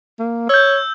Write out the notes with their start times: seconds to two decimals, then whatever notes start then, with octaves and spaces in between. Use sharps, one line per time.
0.19 A#3
0.49 C#5 E6 G6